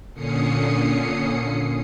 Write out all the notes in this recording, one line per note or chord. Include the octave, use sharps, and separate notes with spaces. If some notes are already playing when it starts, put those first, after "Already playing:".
A#2 D3 C#4 D#6 C7 C#7